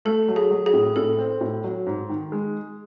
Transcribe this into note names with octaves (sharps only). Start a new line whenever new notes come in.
A3 A4
F#3
G#4
F#3
G#4
A2
A2 A4
C4
A2
F#3
G#2
D#3
G#3